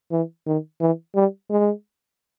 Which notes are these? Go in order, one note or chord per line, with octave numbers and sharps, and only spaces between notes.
E3
D#3
E3
G3
G#3